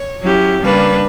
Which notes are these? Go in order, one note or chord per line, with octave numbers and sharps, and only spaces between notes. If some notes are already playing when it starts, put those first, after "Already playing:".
Already playing: C#5
F#3 C#4 E4 G4
C#3 G3 A#3 D4 B4